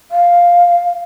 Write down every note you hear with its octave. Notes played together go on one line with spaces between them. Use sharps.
F5